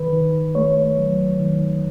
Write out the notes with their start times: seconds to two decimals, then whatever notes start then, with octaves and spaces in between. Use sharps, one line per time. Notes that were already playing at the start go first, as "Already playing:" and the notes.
Already playing: D#3 B4
0.13 D#3
0.55 A3 C#5
0.97 F#3
1.39 D#3